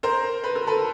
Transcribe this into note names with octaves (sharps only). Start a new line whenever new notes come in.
A#4 C5
B4
A#4
A4 B4